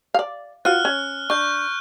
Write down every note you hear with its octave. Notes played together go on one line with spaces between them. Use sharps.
D5 F5
F4 F#4 C5 F6 F#6
C#4
D4 C#6 G6